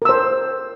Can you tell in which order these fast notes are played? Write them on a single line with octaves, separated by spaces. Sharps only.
A#4 E6 C5